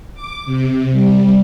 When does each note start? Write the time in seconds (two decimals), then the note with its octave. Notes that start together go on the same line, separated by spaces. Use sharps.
0.14 D6
0.46 C3
0.92 G3